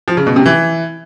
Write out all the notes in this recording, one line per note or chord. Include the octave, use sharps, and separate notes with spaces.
F3
C#3
B2
C3
E3